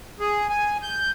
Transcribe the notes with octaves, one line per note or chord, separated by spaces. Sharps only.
G#4
G#5
G6